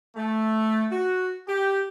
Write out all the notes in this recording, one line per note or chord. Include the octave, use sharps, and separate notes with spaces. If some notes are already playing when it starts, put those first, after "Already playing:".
A3
F#4
G4